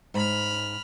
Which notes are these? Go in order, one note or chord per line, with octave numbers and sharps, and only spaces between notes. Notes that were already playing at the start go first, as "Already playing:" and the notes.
G#2 B5 F6